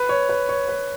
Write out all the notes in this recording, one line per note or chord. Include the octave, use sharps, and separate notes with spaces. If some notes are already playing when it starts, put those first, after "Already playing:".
Already playing: B4
C#5
B4
C#5
B4